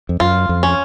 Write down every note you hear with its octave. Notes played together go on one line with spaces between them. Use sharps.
F2
F#2 F4
F2
C#4